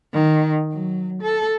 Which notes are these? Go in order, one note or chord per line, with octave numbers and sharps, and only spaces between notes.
D#3
F#3
A4